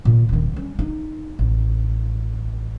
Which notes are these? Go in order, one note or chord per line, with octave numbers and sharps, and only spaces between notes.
A#2 D#3
D#1 D#3
G3 C#4
D#4
A1